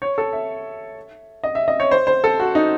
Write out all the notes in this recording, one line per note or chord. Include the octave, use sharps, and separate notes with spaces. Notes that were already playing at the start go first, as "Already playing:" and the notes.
C#5
A4
E5
D#5
E5
D#5
C#5
C5
C5
A4
F#4
D#4